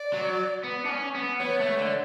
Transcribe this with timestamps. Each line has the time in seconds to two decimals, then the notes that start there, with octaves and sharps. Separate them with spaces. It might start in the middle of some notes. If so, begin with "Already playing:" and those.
Already playing: D5
0.14 F#3
0.64 B3
0.86 D4
0.90 C#4
1.14 B3
1.40 B3 C#5
1.60 A3
1.78 D3